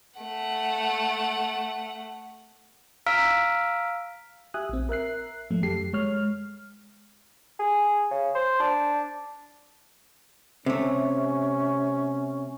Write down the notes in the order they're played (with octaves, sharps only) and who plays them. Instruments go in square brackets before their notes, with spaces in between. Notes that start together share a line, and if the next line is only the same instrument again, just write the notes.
[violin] A3 F#5
[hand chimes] F5 A#5 E6 F6 B6 D7
[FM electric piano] G4 E5 G#5 D#6 F#6
A#1 C4
A#4 E5 F#6 C7
G#2 F3 A3
F#2 G4 A4 C7
G#3 C#5 F6
[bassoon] G#4
C#3
C5
D4
[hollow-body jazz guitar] C3 A3 [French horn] C#4